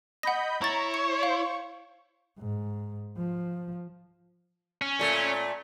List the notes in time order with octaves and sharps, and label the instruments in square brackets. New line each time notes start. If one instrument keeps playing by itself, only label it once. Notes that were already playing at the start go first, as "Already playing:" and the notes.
[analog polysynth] D#5 B5 G6 [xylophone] F#5 A#6
[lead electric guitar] E4 [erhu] C#5 [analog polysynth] A#5 [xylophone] C#6 A6
[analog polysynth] C#6 [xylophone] C#7
[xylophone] F5
[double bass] G#2
F3
[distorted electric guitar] C#4
[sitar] A#2 A3